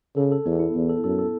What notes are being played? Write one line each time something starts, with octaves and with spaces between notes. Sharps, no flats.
C#3 A4
A4
E2 B3
E4
E2 B3
A4
F#2 A4
A4